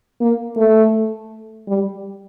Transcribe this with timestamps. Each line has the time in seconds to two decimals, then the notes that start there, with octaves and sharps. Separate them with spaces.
0.21 A#3
0.57 A3
1.68 G3